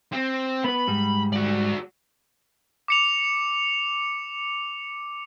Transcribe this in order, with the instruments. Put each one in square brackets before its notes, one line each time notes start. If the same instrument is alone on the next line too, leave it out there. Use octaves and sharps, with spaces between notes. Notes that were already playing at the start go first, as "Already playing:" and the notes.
[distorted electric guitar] C4
[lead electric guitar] B3 B4 [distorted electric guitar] B5
[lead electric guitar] G#2 G3
[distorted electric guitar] F#4 D5
[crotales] D6 C#7 F7